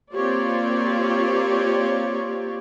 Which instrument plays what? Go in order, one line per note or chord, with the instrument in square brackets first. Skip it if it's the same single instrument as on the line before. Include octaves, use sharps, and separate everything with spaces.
[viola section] A#3 C4 F4 G4 C#5 D5